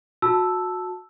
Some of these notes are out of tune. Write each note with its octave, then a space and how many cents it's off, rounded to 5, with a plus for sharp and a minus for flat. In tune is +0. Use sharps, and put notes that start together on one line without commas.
F#4 -25 A5 +0 E6 +0